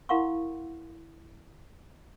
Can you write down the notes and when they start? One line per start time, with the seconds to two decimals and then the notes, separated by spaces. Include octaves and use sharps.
0.09 E4 A#4 F5 F#5 C6 C#6